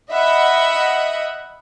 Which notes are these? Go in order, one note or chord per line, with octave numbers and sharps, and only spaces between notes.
D#5 E5 F#5 B5